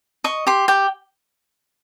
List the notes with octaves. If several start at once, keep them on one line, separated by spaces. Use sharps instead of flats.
D#5 C#6
G4 C6
G4 G5